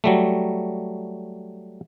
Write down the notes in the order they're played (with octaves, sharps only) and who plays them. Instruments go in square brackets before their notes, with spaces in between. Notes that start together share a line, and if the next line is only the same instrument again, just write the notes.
[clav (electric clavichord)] F#3 G3 A3